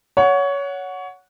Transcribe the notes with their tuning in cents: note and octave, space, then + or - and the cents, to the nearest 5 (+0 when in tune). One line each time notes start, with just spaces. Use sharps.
C#5 +20 F#5 -10